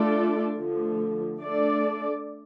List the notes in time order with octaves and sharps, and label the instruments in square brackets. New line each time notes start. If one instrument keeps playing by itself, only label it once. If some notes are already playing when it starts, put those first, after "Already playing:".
Already playing: [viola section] A3 D4 F4 A4 D5
D3 F3 A3
A3 D4 A4 D5